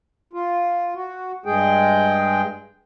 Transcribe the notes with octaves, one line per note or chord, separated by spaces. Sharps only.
F4
F#4
G2 G#3 G#4 G5